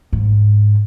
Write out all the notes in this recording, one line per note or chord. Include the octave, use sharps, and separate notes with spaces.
G#2